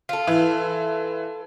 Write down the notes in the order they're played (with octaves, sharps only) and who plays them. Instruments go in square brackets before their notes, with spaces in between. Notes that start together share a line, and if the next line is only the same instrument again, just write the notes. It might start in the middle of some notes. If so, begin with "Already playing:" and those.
[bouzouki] F4 A4
[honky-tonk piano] E3